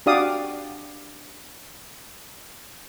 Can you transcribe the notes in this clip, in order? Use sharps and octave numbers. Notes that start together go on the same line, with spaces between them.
D4 F#4 G4 D5 F5 D#6